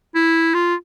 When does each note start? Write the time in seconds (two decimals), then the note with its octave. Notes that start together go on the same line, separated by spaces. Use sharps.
0.15 E4
0.54 F4